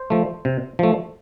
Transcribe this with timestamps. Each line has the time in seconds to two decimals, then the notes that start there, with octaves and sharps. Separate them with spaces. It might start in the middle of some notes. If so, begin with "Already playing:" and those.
Already playing: C5
0.10 F3 A3
0.45 C3
0.79 F3 A3